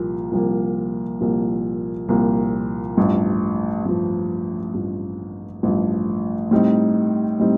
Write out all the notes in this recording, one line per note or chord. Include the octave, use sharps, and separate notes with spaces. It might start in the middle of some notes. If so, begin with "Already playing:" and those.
Already playing: C2 A#2 F3 A#3
C2 A#2 F3 A#3
C2 A#2 F3 A#3
C2 A#2 F3 A#3
A1 G2 F3
A1 G2 F3
A1 G2 F3
A1 G2 F3
A2 G3 C4 D#4
A2 G3 C4 D#4